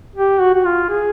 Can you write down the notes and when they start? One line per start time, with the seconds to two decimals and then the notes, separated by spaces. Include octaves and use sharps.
0.15 G4
0.40 F#4
0.55 F#4
0.65 F4
0.89 G#4